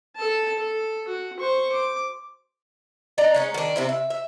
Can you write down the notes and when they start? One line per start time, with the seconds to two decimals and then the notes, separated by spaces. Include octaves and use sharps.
0.16 A4 A5
0.58 A4
1.07 F#4
1.39 C5 C#6
1.72 D6
3.18 D4 D5 D#5 A#5
3.34 G#3 C#4 D#4
3.54 D#3 D4
3.76 C3 C4 E4
3.89 E5
4.10 E5